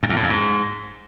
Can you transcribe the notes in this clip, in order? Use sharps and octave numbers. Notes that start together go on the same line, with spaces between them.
F#2
E2
A2
F2
G#2